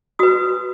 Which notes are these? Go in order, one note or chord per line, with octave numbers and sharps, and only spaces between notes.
F#4 B4 D#6